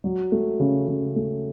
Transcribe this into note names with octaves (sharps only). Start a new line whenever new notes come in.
F#3
A3
C#3
C#3
A3